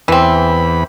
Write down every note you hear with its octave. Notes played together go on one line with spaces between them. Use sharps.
E2 E3 C4 B5